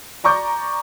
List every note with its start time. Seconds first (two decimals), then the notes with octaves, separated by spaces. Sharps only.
0.24 D5 A#5 C#6 D6 G6